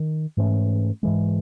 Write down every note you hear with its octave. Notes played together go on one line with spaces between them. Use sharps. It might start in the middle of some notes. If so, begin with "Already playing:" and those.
Already playing: D#3
G#2 E3 A3 C#4
G#2 E3 G#3